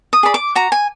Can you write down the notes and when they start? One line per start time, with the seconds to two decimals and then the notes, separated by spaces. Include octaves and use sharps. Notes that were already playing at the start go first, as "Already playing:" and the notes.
0.13 D#6
0.23 G#4 D5 B5
0.34 D6
0.55 F#4 A#5
0.72 G#5